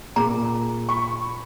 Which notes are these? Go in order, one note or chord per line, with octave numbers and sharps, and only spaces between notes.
A#2 G#4 A#5 D6
B5 C#6